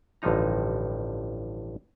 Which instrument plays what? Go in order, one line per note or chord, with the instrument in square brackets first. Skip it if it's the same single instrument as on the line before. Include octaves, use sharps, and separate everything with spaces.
[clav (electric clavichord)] A1 G2 D3 F3 D#4 A#5